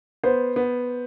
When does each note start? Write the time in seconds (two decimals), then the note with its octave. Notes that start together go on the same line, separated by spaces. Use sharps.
0.23 B3 C5
0.56 B3